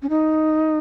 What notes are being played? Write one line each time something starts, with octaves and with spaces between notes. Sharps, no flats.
C#4
D#4